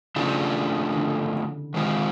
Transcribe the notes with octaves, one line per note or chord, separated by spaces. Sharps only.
C#3 F3 A3 D4 F4
D3
D#3 G#3 C4 F4